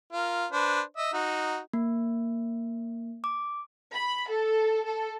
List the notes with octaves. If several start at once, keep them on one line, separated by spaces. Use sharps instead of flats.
F4 A#4
D4 B4 C5
D#5 E5
D#4 F#4
A#3
D6
B5
A4
A4